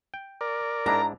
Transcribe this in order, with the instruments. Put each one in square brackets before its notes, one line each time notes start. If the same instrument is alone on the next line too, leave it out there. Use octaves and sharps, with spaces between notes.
[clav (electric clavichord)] G5
[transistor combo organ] A#4 D5
[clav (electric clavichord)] G#2 D4 E4 [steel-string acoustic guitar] A#5